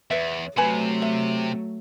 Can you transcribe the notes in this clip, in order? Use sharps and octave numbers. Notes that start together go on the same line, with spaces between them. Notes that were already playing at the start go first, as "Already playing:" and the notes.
E2 B4 E5
C3 F#3 A3 B4 G#5 B5
E5